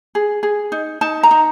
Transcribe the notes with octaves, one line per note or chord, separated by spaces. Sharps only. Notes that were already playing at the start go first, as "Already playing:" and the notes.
G#4
G#4
D#4
D#4 A5
A#5
D#4